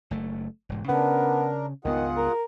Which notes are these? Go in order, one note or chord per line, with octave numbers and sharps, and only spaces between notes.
F#1 A3
E1 G#2
C#3 B3 C#4 D4 A#4
C#2 G2 D#3 B3 F4 G#4 F#5
A#4